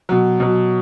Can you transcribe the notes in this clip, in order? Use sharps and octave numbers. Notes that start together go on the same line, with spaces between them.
B2 F#3
B2 F#3